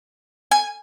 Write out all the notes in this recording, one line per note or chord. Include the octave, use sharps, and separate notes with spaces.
G#5